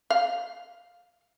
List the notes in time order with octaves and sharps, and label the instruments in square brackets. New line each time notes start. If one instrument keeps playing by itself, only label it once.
[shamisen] F5